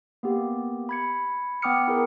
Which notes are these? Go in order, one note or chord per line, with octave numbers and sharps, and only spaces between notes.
A#3 B3 G4
B5 G#6 C#7
B3 G5 D6 D#6 F6 C#7
E4 G#4 A#4